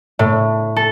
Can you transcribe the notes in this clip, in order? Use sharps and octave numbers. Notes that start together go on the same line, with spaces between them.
A2
A4